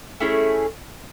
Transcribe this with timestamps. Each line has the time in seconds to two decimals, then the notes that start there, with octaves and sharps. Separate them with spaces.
0.20 A3 C#4 E4 G#4